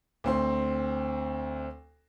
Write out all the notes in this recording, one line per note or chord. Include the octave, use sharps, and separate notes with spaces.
D2 C4 C6